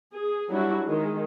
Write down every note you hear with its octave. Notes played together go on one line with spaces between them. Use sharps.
G#4
F#3 G3 D4 E4 F#4
D#3 G#3